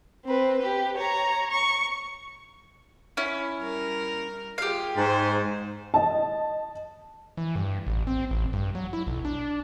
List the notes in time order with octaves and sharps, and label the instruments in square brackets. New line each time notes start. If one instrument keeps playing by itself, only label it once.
[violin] C4 B4
G4 B4
C#5 A#5
C#6
[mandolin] C#4 E4
[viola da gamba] G3 A#4
[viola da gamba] F4 G#4 [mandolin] G4 F5
[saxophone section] G#2 [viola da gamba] G#4 C5
[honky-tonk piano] D#5 A5
[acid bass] E3
G2
A1
C4
A1
G2
F#3
E4
B1
D4